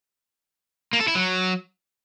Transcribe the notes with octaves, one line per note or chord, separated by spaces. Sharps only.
A#3
A4
E4
F#3